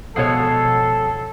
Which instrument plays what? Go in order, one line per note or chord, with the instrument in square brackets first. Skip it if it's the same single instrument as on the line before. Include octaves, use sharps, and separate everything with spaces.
[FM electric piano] B2 F#5 C7 [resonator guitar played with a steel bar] F3 G#3 C#5 [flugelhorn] A4